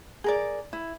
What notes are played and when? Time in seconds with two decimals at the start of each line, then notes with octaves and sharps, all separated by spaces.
0.24 G#4 A#4 D5
0.73 E4